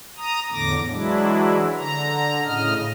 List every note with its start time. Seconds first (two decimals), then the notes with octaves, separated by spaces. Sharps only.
0.17 A#5 D#6
0.52 E2 A2 D3 D6 A#6
0.89 E3 F#3 G#3 D4 E4
1.77 D3 A#5
2.45 A2 C#3 D#5 F6